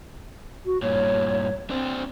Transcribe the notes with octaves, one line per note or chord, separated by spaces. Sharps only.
F#4
G2 A#2 C#5
C4 D4 C5